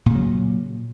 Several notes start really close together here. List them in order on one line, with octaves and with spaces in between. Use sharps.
A#2 C#3 F#3